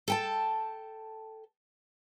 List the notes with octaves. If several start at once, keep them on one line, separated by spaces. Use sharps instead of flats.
A4 G5 A5